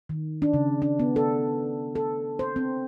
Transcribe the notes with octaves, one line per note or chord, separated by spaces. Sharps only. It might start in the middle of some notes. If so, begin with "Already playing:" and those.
D#3
D4
C#3
D4
B3
A4
A4
C5
C4